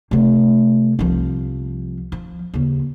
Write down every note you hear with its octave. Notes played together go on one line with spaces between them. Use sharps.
C3 A3
C2 F3
F3
D#2 C#3